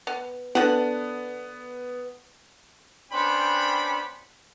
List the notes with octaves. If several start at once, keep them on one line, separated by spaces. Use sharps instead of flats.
B3
D3 B3 F#5
B3 C#4 D4 C5 G5 B5